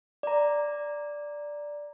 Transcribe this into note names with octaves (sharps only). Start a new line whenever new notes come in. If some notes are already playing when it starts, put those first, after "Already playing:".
D5 A#5